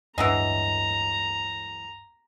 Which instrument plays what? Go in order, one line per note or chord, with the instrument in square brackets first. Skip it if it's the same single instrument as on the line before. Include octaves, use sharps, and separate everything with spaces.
[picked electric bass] D1 G2 D4 [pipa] E3 F#3 G#3 [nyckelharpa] A#5